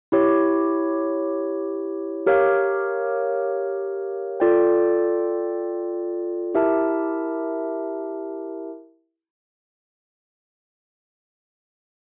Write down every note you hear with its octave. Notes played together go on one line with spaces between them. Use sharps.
E4 G4 C#5
G4 A#4 C#5 F5
F4 A4 D5 G5
E4 G4 A#4 E5 A5